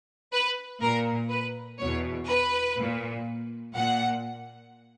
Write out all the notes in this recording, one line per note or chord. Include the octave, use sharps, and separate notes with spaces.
B4
A#2 A#4
B4
E2 B2 C#5
B4
A#2
A#2 F#5